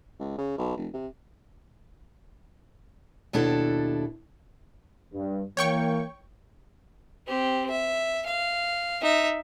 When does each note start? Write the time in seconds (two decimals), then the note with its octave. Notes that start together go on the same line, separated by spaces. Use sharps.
0.20 C#2
0.38 C#3
0.58 B1
0.77 F1
0.94 C3
3.33 D#2 B2 D4 E4 A4
5.13 G2
5.57 E3 A#3 C#5 G5 C#6
7.27 C4 G4
7.70 E5
8.26 F5
9.02 D#4 E5